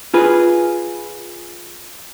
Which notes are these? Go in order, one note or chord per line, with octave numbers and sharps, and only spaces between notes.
F4 G#4 B4